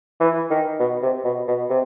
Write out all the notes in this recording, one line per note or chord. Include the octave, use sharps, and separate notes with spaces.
E3
D#3
B2
C3
B2
B2
C3